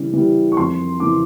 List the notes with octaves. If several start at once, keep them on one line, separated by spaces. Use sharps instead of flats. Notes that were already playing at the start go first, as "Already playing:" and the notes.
Already playing: C#3 E3 G3
E3 G3
C#6
F2 C6
C#3 E3 D6